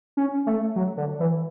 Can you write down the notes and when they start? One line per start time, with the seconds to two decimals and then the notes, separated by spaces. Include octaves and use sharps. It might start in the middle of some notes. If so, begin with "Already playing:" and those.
0.17 C#4
0.47 A3
0.76 F#3
0.97 D3
1.20 E3